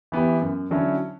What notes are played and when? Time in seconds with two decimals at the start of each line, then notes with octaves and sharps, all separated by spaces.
0.12 E3 B3 E4 G4
0.42 F#2
0.71 D3 F#3 C#4 E4